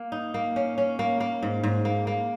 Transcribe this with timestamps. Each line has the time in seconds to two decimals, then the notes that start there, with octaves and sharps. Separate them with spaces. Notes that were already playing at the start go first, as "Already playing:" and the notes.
Already playing: A#3
0.12 D#4
0.34 A#3
0.56 C#4
0.78 C#4
0.99 A#3
1.20 A#3
1.43 G#2
1.63 G#2
1.85 A#3
2.07 A#3